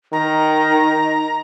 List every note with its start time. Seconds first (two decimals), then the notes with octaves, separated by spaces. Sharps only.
0.13 D#3 A#5
0.69 D#4